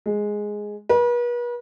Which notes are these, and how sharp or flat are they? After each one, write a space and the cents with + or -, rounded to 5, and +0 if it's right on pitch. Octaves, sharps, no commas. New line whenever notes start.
G#3 +0
B4 -40